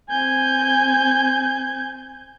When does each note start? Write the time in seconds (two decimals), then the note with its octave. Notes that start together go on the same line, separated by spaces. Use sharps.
0.10 C4 G#5 G6 G#6